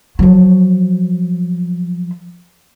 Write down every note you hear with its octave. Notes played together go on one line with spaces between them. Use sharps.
F3 F#3